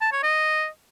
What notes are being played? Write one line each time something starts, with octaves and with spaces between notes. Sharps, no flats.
A5
C#5
D#5